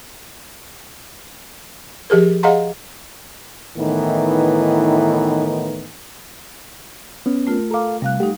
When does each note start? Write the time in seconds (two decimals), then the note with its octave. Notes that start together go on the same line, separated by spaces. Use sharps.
2.10 F3 G4 G#4 A#4
2.43 G#4 D#5 F5 F#5 A#5 C6
3.77 A2 D#3 E3 B3 D#4
7.26 B3 C#4
7.47 A3 F4 A#4
7.71 A4 F5 A#5 D6
8.02 C3 G3 F5 F#6
8.20 A3 D#4 G4 F#5